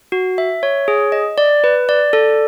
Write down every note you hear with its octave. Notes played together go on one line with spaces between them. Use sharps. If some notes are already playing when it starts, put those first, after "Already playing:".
F#4
E5
C#5
G#4
D#5
D5
B4
D5
A4